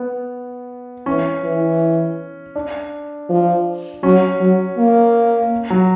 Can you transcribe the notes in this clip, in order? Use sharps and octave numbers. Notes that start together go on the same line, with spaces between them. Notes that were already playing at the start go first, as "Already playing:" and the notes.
Already playing: B3
E3 C#4
E3
D4
F3
F#3 C#4
F#3
A#3
F#3